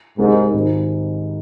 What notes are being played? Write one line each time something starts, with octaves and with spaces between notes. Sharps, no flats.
C2 G#2 C3 G#3 D#4 A#4
G#1 G#2 D#3